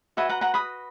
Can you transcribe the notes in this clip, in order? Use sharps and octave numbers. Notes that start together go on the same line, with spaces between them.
F#4 B4 D#5 E5 G#5
F#5 A#5
F#5 A#5
B5 D#6